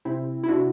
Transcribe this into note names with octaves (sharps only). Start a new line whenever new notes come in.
C3 C4 E4
E4
C3 D4 F#4